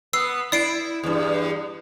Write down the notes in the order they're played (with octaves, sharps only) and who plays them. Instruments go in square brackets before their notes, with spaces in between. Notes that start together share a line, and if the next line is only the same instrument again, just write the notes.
[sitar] B3 [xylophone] E6 C7
[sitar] E4 [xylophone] D5 C7 D7
[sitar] E2 G2